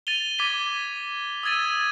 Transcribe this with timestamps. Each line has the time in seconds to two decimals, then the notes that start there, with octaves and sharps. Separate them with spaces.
0.07 A6 D#7 F7 G7
0.38 D6 G#6 B6 D#7 G7
1.43 D#6 E6 G#6 A6 D#7